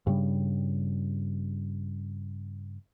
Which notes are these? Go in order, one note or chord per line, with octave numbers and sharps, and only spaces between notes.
G2 C#3 G3